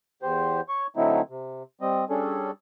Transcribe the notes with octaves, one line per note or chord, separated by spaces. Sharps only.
E2 G4 C5
C#5 C#6
D3 F#3 A3 C4 D#4 E4
C3
G3 C4 D#5
G3 C#4 D4 G#4 A4